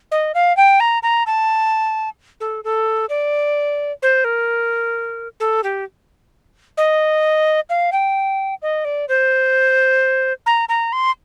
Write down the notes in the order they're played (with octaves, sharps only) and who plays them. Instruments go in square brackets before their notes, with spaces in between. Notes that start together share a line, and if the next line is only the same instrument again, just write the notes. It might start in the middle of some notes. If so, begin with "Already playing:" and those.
[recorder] D#5
F5
G5
A#5
A#5
A5
A4
A4
D5
C5
A#4
A4
G4
D#5
F5
G5
D#5
D5
C5
A#5
A#5
C6